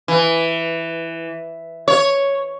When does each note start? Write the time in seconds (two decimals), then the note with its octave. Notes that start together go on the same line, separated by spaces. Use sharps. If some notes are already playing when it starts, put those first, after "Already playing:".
0.08 E3
1.88 C#5